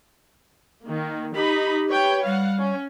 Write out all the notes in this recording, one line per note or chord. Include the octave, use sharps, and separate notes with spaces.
D#3 A#3
D#4 G4 B5
B4 C#5 G5
G3 F5 F#5
C#4